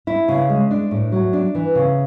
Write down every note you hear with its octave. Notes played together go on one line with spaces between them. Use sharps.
E4
C#3
G#3
D4
A2
F#3
D4
E3
C#3